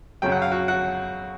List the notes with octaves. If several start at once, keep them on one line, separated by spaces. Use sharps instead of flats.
F#2 C#3 F#3 G5
F#5
F5
F#4 F#5
F#4 F#5